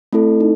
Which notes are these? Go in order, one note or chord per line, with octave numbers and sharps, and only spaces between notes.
A3 C4 E4 A4
D#4